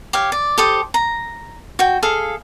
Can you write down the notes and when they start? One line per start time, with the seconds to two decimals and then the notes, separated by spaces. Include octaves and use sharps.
0.13 G4 C#5 F5
0.32 D5
0.58 G4 A4 C5 D#6
0.94 A#5
1.79 F#4 G5
2.03 G#4 A4 F5